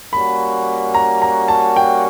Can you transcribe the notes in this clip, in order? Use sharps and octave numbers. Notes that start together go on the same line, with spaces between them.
G3 A#3 C#4 F#4 B5
A#5
A#5
A5
G5